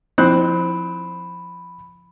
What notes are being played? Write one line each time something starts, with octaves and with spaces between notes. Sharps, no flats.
F3 C4 E4 F4 C5 B5 F#6